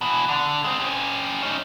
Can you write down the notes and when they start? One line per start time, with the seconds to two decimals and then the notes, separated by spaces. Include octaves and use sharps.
0.01 B2 E3
0.28 D3
0.64 G#3 C4
0.80 C#4 G4
1.43 C#4 D#4